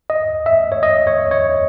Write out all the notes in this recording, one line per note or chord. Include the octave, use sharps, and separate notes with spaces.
D#5
E5
C#5
D#5
C#5
C#5